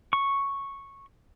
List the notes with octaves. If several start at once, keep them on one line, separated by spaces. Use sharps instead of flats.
C#6